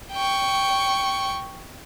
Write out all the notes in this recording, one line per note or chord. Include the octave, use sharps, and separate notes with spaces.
G5 C#6